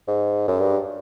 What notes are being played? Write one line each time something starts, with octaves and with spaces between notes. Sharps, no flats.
G#2
F#2
G2